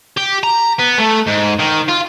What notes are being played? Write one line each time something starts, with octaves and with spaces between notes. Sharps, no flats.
G4
A#5
B3
A3
G#2
D#3
F4